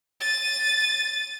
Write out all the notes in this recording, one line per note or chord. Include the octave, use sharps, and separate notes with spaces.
A6 D#7